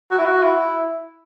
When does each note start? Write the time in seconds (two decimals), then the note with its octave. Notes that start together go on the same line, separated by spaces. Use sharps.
0.11 F#4
0.18 E4
0.25 F#4
0.43 E4